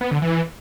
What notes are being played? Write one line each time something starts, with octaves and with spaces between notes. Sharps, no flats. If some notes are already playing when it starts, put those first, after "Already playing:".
B3
D3
E3